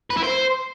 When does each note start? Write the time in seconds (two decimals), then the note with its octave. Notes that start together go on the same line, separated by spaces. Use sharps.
0.10 B4
0.17 E4
0.24 C5